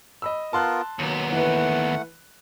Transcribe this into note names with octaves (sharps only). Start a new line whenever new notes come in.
D#5 B5 E6
B3 F4 A#4 A5 C6 F#6
D#2 F#3 B3
E3 A3 B4 F#5